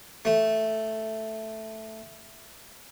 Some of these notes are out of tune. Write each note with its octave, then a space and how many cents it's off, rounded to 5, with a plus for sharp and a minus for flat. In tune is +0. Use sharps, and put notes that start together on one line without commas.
A3 +0